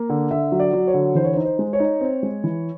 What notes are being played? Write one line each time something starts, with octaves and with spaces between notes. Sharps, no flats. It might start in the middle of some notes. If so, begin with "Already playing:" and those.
Already playing: A#3
D3
D3 E5
F#3
D5
F#3
C#5
D3
E3 C5
C#5
C5
D#4
C5
G#3
C#5
D#4
C4
G#3
E3